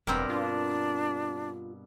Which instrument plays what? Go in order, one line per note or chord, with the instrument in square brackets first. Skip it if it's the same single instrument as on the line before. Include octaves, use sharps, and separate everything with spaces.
[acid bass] E1 [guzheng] G2 B2 A#4 [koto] G3 C4
[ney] D4 [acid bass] F4